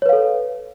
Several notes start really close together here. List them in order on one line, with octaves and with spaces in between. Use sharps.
C#5 B4 F5 A4